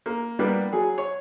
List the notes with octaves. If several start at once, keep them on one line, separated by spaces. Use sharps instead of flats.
A#3
G3 A#3 B3 D4
F#3 G#4
C#5